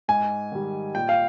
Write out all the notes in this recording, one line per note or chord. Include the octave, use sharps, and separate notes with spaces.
G#2 G#5
D#3 G3
A#2 G5
F5